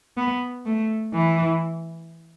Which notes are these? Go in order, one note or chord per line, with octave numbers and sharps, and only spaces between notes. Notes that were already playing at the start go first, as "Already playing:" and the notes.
B3
A3
E3